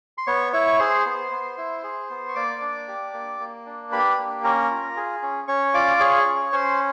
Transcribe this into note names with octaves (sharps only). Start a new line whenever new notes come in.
C6
B3 C#5 C#6
E4 C#5 C#6
G#4 C5 C6
B3
B3
E4
G#4
B3
C#6
A#3 D5 D6
D4
G4
A#3
A#3
D4
G4 B4 B5
A#3
C#4 A#4 A#5
F4
G#4
C#4
C#4 C#5 C#6
F4 D5 D6
G#4 C#5 C#6
C#4
C#4 C5 C6